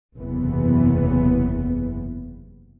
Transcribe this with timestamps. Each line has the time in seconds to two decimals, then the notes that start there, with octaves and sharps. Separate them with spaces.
0.17 F#1 E2 C3 E3 B3